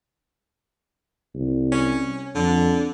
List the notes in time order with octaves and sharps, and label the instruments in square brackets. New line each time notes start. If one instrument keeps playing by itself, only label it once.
[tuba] C2
[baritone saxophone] C#4
[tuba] F2 [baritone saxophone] D3